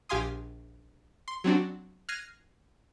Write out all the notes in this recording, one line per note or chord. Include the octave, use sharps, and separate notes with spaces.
A#1 G4 F5 G#5 C6 D#6
C6
F#3 C4 D4 F#4
F6 F#6 G#6 A#6 C7 D#7